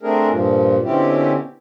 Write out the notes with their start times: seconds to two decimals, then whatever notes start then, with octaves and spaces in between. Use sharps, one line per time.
0.03 A3 C4 D4 G#4 A#4
0.30 G2 A#2 F3
0.85 B2 D3 C4 C#4 E4 G4